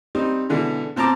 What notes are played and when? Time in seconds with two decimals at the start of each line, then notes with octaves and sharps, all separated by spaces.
0.15 G3 C4 D#4
0.49 B2 D3 E3 G#3
0.96 B2 C4 A5 A#5 D6